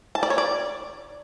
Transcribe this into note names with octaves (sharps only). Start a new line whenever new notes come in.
A5
D5
C#5
D5